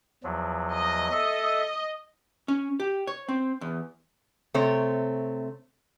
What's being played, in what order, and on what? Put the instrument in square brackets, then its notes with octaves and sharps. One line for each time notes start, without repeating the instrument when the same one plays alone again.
[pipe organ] E2 F3 F#3
[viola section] D#5
[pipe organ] A4 E5
[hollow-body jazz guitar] C#4
G4
C#5
C4
E2
[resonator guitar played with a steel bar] C3 A3 C4 C#5